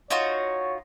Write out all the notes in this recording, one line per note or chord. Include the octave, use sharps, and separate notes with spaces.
D#4 F4 F#4 C#5